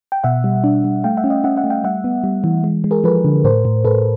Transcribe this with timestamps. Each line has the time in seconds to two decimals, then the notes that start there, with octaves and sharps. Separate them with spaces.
0.12 G5
0.24 B2 E5 F#5
0.44 G3
0.64 D4
0.84 G3
1.04 A3 F5 G5
1.17 E5 F#5
1.24 C#4
1.30 D#5 F5
1.44 C#4 E5 F#5
1.57 E5 F#5
1.64 A3
1.70 F5 G5
1.84 G3 E5 F#5
2.04 B3
2.24 G3
2.44 E3
2.64 G#3
2.84 G#3
2.91 G#4 A#4
3.04 F3 A4 B4
3.25 D3
3.44 A2 A#4 C5
3.65 A2
3.85 A2 A4 B4